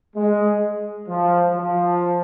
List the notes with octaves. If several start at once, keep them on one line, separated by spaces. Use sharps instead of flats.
G#3
F3
F3